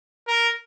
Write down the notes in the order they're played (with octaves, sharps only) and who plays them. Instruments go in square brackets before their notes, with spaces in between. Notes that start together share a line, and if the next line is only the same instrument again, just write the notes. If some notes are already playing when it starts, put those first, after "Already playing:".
[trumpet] A#4